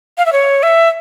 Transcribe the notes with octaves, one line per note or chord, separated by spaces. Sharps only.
F5
E5
C#5
E5